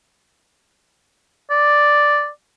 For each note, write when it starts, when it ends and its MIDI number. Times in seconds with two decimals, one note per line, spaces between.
1.51 2.29 74